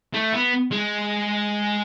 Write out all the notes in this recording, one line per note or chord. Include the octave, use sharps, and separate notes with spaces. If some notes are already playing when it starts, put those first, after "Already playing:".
A3
B3
G#3